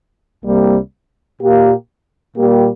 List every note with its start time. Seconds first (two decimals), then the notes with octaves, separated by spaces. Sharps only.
0.44 C2 C3 G3 A#3
1.40 A#2 A#3 G4
2.35 A#2 G3 A#3 G4